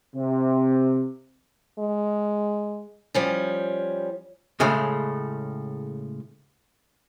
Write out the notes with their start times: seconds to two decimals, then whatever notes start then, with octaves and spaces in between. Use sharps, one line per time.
0.15 C3
1.79 G#3
3.14 F3 G3 C#4
4.60 A2 C#3 G#3 A3